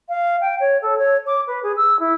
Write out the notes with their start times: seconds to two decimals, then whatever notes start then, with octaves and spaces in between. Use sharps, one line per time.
0.09 F5
0.41 G5
0.60 C#5
0.82 A4
0.98 C#5
1.27 D6
1.47 B4
1.63 G#4
1.77 E6
2.00 E4